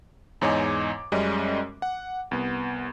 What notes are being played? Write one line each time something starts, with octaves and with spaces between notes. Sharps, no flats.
E2 G#2 C#5 D#5 G#5 D6
F#2 G3 G#3 C#4 D#5
F#5
C2 B3